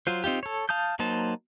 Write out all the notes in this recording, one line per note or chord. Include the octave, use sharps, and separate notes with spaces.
F#3 F4 C5
C4 D#4 F4 G4
A4 C#5
F5 A5 D#6 G6
F#3 A#3 D#4 C5 A5